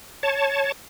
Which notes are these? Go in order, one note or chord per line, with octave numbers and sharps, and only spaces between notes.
C#5 A5